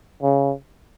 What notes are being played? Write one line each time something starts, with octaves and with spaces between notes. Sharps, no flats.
C#3